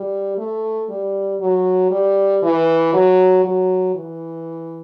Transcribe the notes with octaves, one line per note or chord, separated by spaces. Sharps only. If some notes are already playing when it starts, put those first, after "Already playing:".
Already playing: G3
A3
G3
F#3
G3
E3
F#3
F#3
E3